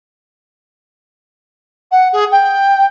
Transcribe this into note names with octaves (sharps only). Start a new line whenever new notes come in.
F#5
G#4
G5